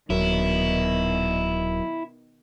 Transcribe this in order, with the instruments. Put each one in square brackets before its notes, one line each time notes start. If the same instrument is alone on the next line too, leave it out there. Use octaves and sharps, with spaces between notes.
[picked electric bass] D#1 [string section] B2 D#3 [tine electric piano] F#3 A#4 [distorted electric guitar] E4